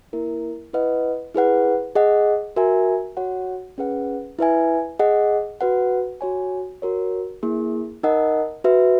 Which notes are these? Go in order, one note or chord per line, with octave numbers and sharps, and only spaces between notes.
A#3 E4 A#4
E4 B4 D#5 F#5
E4 G#4 B4 F#5
G#4 D#5 F#5
F#4 A#4 E5 G#5
F#4 C#5 F#5
C#4 G#4 B4 F#5
E4 B4 E5 G#5
G#4 D#5 F#5
F#4 B4 F#5
F#4 C#5 G#5
F#4 A#4 C#5
A#3 E4 G#4
D#4 A#4 D#5 F#5
F#4 B4 E5